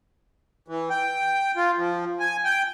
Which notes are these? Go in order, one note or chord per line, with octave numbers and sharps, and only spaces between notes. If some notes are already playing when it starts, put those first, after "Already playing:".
E3
G5
F4
F3
G#5
G5